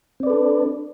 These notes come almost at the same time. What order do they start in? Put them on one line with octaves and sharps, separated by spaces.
C4 D5 B4 A4 D4